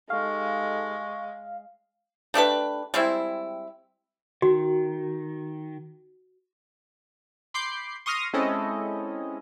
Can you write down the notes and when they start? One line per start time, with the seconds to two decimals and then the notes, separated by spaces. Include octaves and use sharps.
0.10 G#3 D#4 G4 A4 F5 C#6
2.34 A3 D4 G4 B4
2.94 G3 G#3 C4 E4
4.42 D#3 F#4
7.54 B5 C6 D6 G6 C7
8.06 C6 C#6 D#6 F6 A#6
8.33 G#3 C4 C#4 E4 A4 D#5